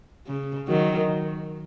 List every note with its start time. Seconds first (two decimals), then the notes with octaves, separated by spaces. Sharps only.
0.28 C#3
0.68 D#3 F#3